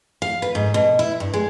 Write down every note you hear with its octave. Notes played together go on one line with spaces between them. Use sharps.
F5
B4
G#2
B2
E4
G2
G#3